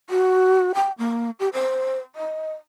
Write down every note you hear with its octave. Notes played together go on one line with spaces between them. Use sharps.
F#4
G5
A#3
G4
C5
D#5